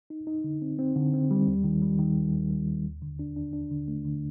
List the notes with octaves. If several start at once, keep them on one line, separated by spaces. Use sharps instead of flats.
D#4
D#4
D3
C4
C4
D3
C4
G3
D#2
D#3
G3
D#3
D#2
D#2
G3
D#2
D2
D3
D4
D4
D4
D3
A3
D3